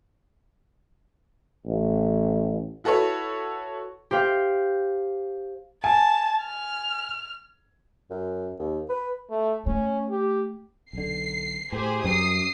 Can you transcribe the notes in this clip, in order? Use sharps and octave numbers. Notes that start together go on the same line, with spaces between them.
A1
E4 F#4 A4 B4 C#5
G4 C5 F5 G5
G#5 A5
F6
F#2
D#2
B4
A3
A3 C#4
G4
B1 D3 C7
A2 G4 G#4 C5
F#2 G3 D#6 C7